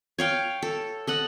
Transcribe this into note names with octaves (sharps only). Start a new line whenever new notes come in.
C#5 F5 G5
A4
A4 D#5 F#5